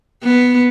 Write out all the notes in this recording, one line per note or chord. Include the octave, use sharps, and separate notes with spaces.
B3